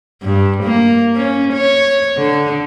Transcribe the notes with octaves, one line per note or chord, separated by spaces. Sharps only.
G2
A#3
C#4
C#5
D3